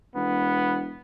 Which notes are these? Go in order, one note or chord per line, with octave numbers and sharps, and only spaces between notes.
E1 B3